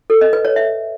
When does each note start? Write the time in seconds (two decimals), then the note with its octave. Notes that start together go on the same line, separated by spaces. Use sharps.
0.10 A4
0.21 D#5
0.33 B4
0.45 C#5
0.56 E5